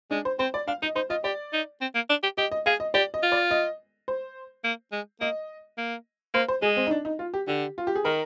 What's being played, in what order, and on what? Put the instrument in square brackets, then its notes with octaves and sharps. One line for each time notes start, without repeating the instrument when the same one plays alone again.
[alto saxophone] G#3 [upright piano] D4
[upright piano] C5
[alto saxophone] C4 [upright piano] C5
[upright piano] D5
[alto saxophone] D4 [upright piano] F5
[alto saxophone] D#4 [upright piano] D#5
[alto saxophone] D#4 [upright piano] C5
[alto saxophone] F4 [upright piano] D#5
[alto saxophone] G4 [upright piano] D5
[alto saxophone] D#4
C4
A#3
D4
G4
[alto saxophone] G4 [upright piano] D#5
[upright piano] D#5
[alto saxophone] G#4 [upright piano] F5
[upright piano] D#5
[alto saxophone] G4 [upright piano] D5
[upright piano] D#5
[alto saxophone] F4
[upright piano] D5
D#5
C5
[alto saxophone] A#3
G#3
[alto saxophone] A#3 [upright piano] D#5
[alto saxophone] A#3
[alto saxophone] A#3 [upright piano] C5
[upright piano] C5
[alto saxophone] G#3 [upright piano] G#4
[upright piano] C4
D#4
D4
D#4
F4
G4
[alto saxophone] D3 [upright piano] G4
[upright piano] F4
G4
G#4
[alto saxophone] D#3 [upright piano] A#4